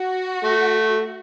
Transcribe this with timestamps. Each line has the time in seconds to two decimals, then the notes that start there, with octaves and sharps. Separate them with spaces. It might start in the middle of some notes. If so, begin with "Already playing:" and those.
Already playing: F#4
0.44 A3